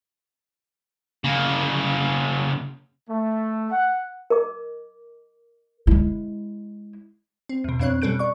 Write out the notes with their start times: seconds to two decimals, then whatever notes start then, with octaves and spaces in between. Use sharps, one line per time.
1.24 C#3 A#3
3.09 A3
3.71 F#5
4.30 A#4 D#5 D6
5.87 G#3 E4
7.49 C4
7.64 E2 B2
7.79 F2 B2 C4 D4 C#5 F#6
8.02 B2 G3 C#4 A4 F#6 D7
8.19 D5 C#6